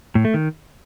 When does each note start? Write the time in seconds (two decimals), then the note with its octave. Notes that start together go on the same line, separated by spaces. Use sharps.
0.15 A2
0.25 A3
0.34 D#3